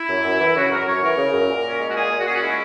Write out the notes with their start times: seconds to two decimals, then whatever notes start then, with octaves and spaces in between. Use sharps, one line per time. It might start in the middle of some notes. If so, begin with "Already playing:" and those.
Already playing: E4
0.09 F#2
0.25 F#2
0.40 E3
0.56 C#3 F#4
0.71 F#2 A#4
0.87 F#2 C#5
1.03 E3 A#4
1.18 C#3
1.34 F#2
1.49 A#2
1.64 C#4
1.80 G#3
1.89 F#4
1.95 A#2 G#4
2.12 A#2
2.18 F#4
2.26 C#4 G#4
2.34 F#4
2.42 G#3 E4